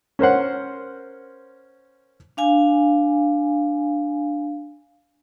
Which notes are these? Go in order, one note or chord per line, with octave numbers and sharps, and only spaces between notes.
C#4 A#4 C5 F#5
D4 F5 G#5